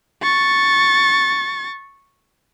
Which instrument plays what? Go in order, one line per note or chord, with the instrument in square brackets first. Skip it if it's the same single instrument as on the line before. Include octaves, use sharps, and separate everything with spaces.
[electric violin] C#6 A6